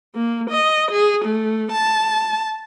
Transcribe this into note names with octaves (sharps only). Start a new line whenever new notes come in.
A#3
D#5
G#4
A3
A5